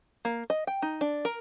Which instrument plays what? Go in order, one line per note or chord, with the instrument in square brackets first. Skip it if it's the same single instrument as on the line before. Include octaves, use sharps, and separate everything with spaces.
[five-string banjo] A#3
D#5
G5
D#4
D4
A#4